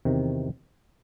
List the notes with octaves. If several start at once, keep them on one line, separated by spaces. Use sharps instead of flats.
E2 C3 D#3